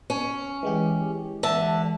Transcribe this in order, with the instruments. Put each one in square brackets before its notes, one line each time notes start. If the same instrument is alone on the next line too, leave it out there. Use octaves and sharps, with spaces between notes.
[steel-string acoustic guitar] C#4
[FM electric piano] E3 G#3 G4
[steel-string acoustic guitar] D3 E5 A5